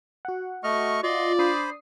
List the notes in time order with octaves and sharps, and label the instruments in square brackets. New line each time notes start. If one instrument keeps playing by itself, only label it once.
[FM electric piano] F#4 F#5
[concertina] A3 D#5 F6 [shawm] C#6
[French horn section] F4 [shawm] D5 [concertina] D#5 C6
[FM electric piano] D4 D#6 C7 [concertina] C5 B5